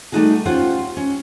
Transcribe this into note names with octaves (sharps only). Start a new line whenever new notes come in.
G3 A3 B3 D#4 F#4 G#4
C#4 F4 G4 C5 F#5
C#4